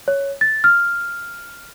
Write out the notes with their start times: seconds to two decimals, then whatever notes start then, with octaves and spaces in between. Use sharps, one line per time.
0.08 C#5
0.41 A6
0.64 F6